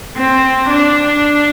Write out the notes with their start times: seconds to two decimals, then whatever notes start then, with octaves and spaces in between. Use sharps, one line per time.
0.17 C4
0.70 D4